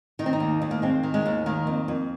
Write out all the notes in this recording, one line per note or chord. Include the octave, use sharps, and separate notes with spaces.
D#3 D#4
C4
D#4
D#2
D#2
A#3
G#3 C4
D#3
G#3
D#2
D#3 A#3
F2
F2